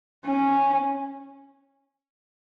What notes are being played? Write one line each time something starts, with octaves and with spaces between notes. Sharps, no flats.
C#4